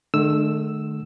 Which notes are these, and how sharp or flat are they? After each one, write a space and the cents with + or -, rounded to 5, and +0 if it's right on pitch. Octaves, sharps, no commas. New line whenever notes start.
D3 +40 A3 -35 E6 +0